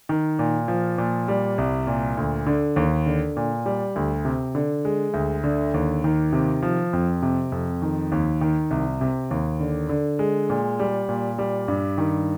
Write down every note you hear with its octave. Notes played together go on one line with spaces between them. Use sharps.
D#3
A#2
F3
A#2
G3
C2
A#2
D2
D3
D#2
D3
A#2
G3
D2
C3
D3
G#3
D2
D3
D#2
D#3
C3
F3
F2
C3
F2
D#3
D#2
D#3
C2
C3
D#2
D3
D3
G#3
A#2
G3
A#2
G3
G2
D#3